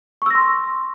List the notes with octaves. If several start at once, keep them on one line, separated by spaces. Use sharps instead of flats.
C6 C#6 E6 A#6